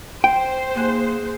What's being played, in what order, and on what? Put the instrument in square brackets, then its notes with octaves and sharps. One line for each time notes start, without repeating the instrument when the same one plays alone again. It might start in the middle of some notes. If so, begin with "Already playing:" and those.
[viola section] C5 [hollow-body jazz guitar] G5
[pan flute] A#3 [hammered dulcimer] G#4 F#5